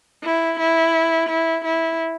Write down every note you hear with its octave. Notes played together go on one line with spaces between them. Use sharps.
E4
E4
E4
E4